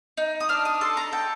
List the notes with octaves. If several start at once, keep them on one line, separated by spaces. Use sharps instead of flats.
D#4
D#6
D4 F6
D#6
A4 C6
A#5
A4 G5